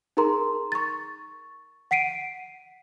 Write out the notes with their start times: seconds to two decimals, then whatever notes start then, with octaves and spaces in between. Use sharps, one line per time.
0.17 D#4 G#4 A#4 A#5 C6
0.72 C#6 A6
1.91 F#5 B6 C7 D7 D#7